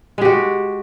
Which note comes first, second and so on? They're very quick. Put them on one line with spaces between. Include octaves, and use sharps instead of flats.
G#3 G4 F#4